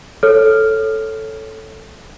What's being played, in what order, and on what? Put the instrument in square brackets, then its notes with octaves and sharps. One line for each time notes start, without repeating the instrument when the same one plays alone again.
[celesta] A4 C#5 F6